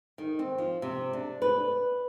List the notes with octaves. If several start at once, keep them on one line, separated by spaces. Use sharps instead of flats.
D#3
C4
F3
C3
D4
B4